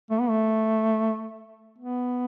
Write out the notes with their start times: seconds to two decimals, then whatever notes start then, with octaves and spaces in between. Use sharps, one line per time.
0.10 A3
0.20 B3
0.29 A3
1.78 B3